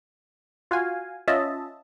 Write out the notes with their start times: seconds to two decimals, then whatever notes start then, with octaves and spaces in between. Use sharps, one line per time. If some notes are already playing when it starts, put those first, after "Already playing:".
0.71 F4 F#4 F5 G#5
1.28 C#4 F4 D#5 E5 A5